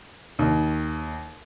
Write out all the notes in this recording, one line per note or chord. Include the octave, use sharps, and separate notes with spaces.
D#2